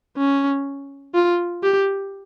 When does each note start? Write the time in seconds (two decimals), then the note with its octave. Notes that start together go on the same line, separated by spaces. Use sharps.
0.17 C#4
1.14 F4
1.63 G4